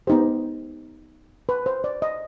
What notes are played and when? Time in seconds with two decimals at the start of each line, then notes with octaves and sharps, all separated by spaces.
0.07 B3 D#4 G4 C5
1.49 B4
1.66 C5
1.84 D5
2.02 D#5